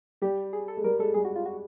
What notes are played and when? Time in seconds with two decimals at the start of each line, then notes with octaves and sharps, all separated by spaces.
0.22 G3 G4
0.53 G#4
0.68 A4
0.77 G#3
0.84 G3 A#4
0.99 G#3 A4
1.14 G3 G#4
1.25 F#4
1.36 F4
1.46 F#4